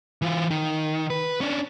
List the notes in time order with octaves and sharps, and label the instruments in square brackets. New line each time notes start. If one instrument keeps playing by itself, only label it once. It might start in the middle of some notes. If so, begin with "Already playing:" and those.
[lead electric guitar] E3 F4
D#3
B4
C#4 D4